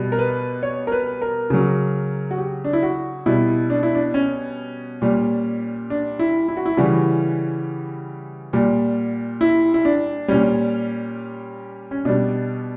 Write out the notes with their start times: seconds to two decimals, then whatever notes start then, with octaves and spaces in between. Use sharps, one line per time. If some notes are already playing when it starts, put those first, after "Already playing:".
Already playing: B2 G3
0.12 A#4
0.19 B4
0.63 C#5
0.87 A#4
0.92 B4
1.22 A#4
1.50 C#3 F#3
2.31 F#4
2.38 G4
2.64 D4
2.73 E4
2.83 F#4
3.26 B2 G3 E4
3.70 D4
3.83 E4
3.95 D4
4.14 C#4
5.02 A#2 G3
5.90 D4
6.19 E4
6.48 E4
6.57 F#4
6.66 E4
6.77 C#3 E3 G3 F#4
8.53 A#2 G3
9.41 E4
9.74 E4
9.85 D4
10.28 A#2 G3 C#4
11.91 C#4
12.05 B2 G3 D4